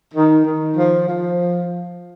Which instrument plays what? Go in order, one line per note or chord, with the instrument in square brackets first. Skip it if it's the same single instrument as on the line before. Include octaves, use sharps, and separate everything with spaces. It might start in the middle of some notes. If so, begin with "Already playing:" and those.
[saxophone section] D#3
D#3
F3
F3